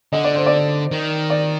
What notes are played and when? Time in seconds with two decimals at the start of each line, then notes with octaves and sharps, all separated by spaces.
0.13 D3 D#5
0.24 D5
0.35 C5
0.46 D5
0.91 D#3
1.30 D5